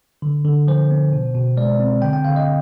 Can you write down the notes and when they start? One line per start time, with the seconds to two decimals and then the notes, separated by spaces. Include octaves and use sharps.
0.22 D3
0.45 D3
0.67 F3 C5
0.91 B3
1.13 B2
1.35 B2
1.57 G#3 D5
1.79 C4
2.02 D3 G5
2.13 G5
2.25 D3 F5
2.36 D#5